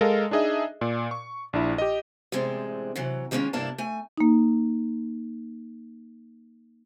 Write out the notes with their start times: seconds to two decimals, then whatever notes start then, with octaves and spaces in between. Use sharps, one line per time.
0.01 G#3 A4 A#4 D#5 F5
0.31 D4 D#4 G#4 D#5 E5
0.81 A#2 D5
1.11 C#6
1.53 A#1 D4 E4
1.78 G4 D#5
2.32 E2 A2 C3 G#3 C4 D4
2.96 C3 E3 F#3
3.31 D#3 G3 G#3 A#3 C#4 F4
3.53 G2 C3 A#3 D4 E4 A5
3.78 A3 G#5
4.18 A#3 D#4